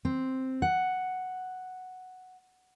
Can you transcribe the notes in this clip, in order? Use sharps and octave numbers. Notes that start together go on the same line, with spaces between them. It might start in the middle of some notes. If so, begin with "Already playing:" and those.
C4
F#5